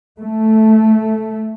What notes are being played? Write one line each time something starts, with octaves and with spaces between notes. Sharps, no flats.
A3